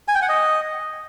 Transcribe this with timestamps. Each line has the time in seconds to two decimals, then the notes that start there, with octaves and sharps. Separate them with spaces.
0.08 G#5
0.15 G5
0.22 F#5
0.29 D#5